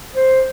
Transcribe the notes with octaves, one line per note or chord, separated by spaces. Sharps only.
C5